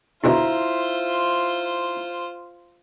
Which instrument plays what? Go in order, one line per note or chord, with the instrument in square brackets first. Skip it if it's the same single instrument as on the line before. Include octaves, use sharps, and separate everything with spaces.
[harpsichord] E2 B2 D3 [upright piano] E4 E5 A#5 [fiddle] F4 C5